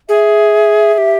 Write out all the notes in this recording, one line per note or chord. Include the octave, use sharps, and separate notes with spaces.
G#4 E5
G#4
G4